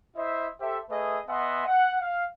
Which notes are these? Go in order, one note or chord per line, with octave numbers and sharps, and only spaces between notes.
E4 C5 D#5 E5
G4 A4 C5 E5
A3 G#4 B4 D#5 E5
B3 D#5 E5 F#5 G#5 C6
F#5
F5